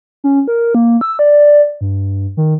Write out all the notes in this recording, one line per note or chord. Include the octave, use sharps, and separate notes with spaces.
C#4
A#4
A#3
E6
D5
G2
D#3